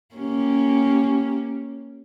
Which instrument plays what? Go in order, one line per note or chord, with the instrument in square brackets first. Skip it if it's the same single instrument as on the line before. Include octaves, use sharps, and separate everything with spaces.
[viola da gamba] A#3 C#4 G4